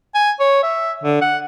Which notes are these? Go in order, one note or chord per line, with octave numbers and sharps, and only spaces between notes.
G#5
C#5
E5
D3
F#5